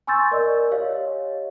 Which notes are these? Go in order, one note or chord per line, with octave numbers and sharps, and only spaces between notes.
G#5 C6 C#6 E6 G6 A6
A#4 D5 D#5
G4 C#5 D#5 F5